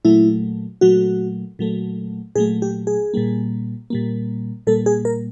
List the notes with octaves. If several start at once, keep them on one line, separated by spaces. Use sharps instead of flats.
A#2 F#3 A3 E4
A#2 F#3 A3 F#4
A#2 F#3 A3
A#2 F#3 A3 G#4
G4
G#4
A#2 G3 A#3
A#2 G3 A#3
A#2 G3 A#3 A4
G#4
A#4